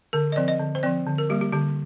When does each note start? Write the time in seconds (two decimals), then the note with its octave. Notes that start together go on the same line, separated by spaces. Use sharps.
0.13 D3 A#4
0.32 D#5
0.36 F3 C4 D5
0.48 D#5
0.60 D3
0.75 C5
0.83 F3 C4 D5
1.07 D3
1.18 A#4
1.29 G3 A#3 G4
1.41 G4
1.52 D3 G4